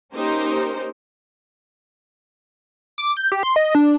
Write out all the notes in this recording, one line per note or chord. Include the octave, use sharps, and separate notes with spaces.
A#3 C#4 D#4 G4 A#4 C5
D6
G6
G4
C6
D#5
D4